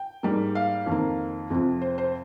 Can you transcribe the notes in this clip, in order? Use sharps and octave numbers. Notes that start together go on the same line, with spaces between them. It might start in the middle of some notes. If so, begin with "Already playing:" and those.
Already playing: G5
G#2 G3 A#3
F5
F2 D#3 A#3
F2 C3 F3
C5
C5